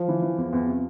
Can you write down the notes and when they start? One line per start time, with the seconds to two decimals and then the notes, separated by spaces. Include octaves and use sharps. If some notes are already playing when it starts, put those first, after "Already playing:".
Already playing: F3
0.08 E3
0.22 E3
0.38 E2
0.53 E2
0.68 C3